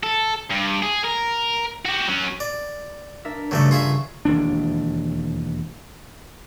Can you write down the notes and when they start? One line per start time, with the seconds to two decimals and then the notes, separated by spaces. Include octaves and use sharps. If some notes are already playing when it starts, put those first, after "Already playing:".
0.03 A4
0.51 G2
0.83 G#4
1.04 A#4
1.85 F#4 G4
2.08 F#3 C#4
2.40 D5
3.25 D4 A#4 E5
3.51 G1 C#3 F#3 A3 D5 C#6
3.71 F4 G#4 E5
4.25 E1 D#2 D4